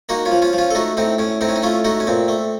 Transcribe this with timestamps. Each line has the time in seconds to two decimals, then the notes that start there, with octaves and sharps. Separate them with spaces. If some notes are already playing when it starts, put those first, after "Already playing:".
0.09 A#3 D#4 F#4
0.25 C#4 F4
0.31 F3
0.42 C#4 F4
0.53 F3
0.58 C#4 F4
0.71 A4
0.75 A3 D#4 F#4
0.97 A2 C4 D#4
1.19 A2 C#4
1.41 A2 C4 D#4
1.49 C#4
1.56 D#4
1.62 A3 C#4 F4
1.85 A3 D#4 F#4
2.00 C#4
2.07 A#2 C4
2.28 A3